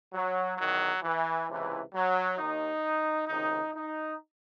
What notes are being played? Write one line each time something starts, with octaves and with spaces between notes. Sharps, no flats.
F#3
E2 D#3 F#3
E3
C#2 C3 E3
F#3
D#2 D#3 D#4
C#2 C3 D#3 D#4
D#4